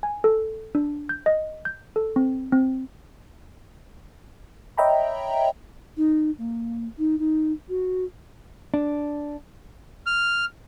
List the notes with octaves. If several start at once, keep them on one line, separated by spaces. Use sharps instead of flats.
G#5
A4
D4
G6
D#5
G6
A4
C4
C4
C#5 D#5 E5 G5 A#5 B5
D#4
A#3
D#4
D#4
F#4
D4
F6